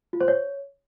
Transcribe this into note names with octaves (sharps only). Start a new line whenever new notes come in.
F4
C5
C#5